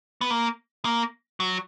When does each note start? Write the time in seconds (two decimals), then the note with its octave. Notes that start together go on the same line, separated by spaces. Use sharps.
0.21 B3
0.30 A#3
0.85 A#3
1.40 F#3